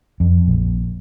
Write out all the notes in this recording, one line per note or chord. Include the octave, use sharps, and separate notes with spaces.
F2
A#1